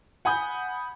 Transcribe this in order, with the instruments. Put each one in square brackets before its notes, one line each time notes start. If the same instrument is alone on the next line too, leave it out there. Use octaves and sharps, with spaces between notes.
[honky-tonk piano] F#5 G#5 B5 D#6 G6